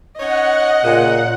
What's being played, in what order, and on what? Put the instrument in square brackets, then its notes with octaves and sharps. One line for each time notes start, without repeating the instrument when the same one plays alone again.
[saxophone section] C#4 D#4 C#5 [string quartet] D#5 [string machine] F#5
[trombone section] A#2 [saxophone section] C#3